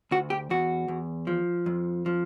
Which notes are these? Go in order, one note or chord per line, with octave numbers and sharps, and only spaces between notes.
D2 F#4
G4
E2 F#4
E2
F3
F2
F3